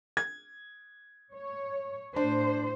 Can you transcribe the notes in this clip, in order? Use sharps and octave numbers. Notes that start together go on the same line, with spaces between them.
G#6
C#5
A2 D4 C5